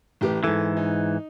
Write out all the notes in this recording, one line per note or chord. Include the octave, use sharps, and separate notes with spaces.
A1 G4 B4
G#2 E3 A4
D#4